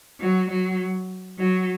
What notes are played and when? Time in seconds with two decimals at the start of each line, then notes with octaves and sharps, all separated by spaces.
0.19 F#3
0.50 F#3
1.38 F#3